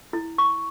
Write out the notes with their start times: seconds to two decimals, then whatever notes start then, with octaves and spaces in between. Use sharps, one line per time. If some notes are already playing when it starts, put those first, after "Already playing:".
0.13 E4
0.38 C#6